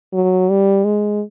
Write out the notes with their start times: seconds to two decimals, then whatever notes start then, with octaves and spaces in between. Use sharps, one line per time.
0.13 F#3
0.50 G3
0.85 G#3